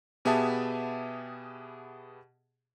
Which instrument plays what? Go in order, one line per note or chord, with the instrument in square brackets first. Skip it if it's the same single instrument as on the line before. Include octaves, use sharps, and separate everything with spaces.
[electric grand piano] B2 B3 G4 G#4 E5 A5